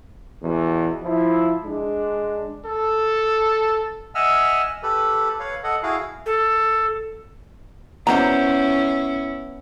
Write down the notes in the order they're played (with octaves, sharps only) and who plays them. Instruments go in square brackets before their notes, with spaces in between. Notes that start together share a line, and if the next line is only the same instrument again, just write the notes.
[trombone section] E2 B2 E3
F3 E4
G#3 D4
[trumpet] A4
[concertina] D#5 E5 F#5 G#5 E6 F6
G4 A4 B4
B4 C#5 F5
A4 D#5 F#5
E4 F#4 G#4 F5
[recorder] A4
[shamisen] D3 F#3 A#5 [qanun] B3 C5 [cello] C#4 E4